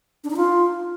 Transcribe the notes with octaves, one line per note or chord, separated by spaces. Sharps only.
D4
D#4
F4